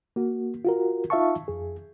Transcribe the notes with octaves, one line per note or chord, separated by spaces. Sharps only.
A#3 F#4
F4 F#4 A#4
D#4 F4 E5 F5 A5 C#6
F2 G#4